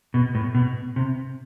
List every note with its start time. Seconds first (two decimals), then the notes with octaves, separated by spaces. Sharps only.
0.14 B2
0.35 A2
0.55 B2
0.96 C3